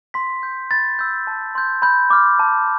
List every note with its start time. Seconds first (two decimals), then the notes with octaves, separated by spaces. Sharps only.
0.14 C6 B6
0.43 G6
0.71 B5 A6
0.99 E6 G6
1.27 A5
1.55 C6 G6
1.82 B5 G6
2.10 D6 F6
2.39 A5